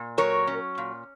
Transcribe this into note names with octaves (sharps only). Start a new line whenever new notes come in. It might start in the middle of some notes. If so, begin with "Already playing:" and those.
Already playing: A#2
F#3 A#4 C#5
C#4
A#2